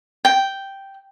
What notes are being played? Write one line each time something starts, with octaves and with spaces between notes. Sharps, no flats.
G5